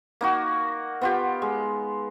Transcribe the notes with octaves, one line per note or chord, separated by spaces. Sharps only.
A#3 D#4 F#4
B3 F4 G4
G#3